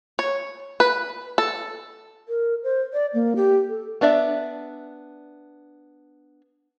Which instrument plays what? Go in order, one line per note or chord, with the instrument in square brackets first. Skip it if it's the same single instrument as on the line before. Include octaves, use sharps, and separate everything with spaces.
[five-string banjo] C#5
B4
A4
[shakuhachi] A#4
C5
D5
A#3
G4
A4
[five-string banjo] B3 D4 D5 E5